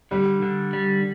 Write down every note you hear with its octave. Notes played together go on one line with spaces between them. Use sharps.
D3 G3
D3
G3